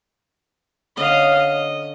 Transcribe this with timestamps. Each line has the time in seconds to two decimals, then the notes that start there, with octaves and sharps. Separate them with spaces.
0.97 D3 C#4 D#5 F5
1.35 D#5